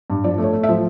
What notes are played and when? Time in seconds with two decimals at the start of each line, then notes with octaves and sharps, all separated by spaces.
0.10 G2
0.24 F3 D5
0.38 A3
0.44 C#5
0.53 A3
0.63 E5
0.69 F3